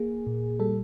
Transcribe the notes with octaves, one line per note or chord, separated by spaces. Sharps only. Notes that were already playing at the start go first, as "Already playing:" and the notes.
Already playing: A#3 G#4
A#2
G3 A4